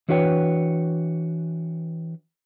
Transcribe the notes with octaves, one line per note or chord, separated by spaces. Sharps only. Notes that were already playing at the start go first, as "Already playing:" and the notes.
E3 D4 F#4 B4 C#5 G5